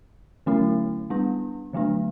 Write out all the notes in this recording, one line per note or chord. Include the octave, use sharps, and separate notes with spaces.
D3 F#3 A3 C#4 E4
G3 B3 D4
D3 F#3 A3 D4